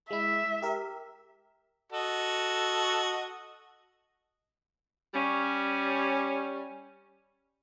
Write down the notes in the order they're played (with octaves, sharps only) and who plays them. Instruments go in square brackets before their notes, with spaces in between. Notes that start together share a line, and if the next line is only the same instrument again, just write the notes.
[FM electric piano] G#3 E4 [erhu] E5
[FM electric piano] G4 A#4
[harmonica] F#4 A4 D#5
[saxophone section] G3 C#4